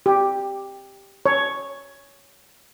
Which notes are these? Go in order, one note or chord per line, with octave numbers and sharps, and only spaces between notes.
G4
C#5